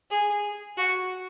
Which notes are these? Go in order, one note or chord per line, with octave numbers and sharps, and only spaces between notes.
G#4
F#4